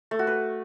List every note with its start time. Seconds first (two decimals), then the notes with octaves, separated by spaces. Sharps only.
0.11 A3
0.19 F#4
0.27 B4